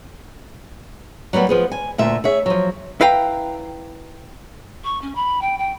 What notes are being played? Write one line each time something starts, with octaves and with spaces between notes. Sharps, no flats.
F#3 G3 A#3 B3
F3 B3 G#4
G#5
D2 A#2 E5
G#4 C#5 E5
F3 F#3
E4 B4 F5 G5 A#5
C#6
C#4
B5
G5
G5